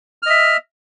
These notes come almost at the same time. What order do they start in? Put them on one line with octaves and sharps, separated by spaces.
F6 D#5 E5